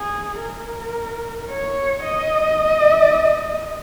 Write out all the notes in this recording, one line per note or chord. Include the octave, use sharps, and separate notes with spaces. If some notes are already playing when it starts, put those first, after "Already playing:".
Already playing: G#4
A#4
C#5
D#5